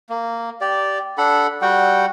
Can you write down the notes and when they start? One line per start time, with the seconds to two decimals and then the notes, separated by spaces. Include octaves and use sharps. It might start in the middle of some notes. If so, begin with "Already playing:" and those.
0.09 A#3
0.61 G4 D5
1.18 D4 A4 F#5 B5
1.62 G3 F#4 F#5 G5